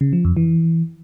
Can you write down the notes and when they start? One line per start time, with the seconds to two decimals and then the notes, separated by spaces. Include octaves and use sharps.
0.01 C#3
0.13 F3
0.25 F2
0.37 E3